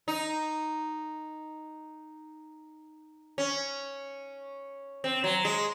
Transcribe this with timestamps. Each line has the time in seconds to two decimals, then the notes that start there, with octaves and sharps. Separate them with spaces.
0.08 D#4
3.38 C#4
5.04 C4
5.24 F#3
5.45 G#3